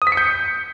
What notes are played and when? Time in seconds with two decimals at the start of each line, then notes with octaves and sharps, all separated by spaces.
0.02 D#6
0.07 B6
0.12 C#7
0.17 G6